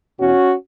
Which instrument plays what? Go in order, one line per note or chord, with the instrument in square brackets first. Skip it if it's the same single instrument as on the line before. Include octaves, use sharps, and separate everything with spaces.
[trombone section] E2 B2 C#4 F#4